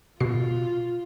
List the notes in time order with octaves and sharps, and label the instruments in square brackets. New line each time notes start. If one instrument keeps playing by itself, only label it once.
[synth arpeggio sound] B2 C7 [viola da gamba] F4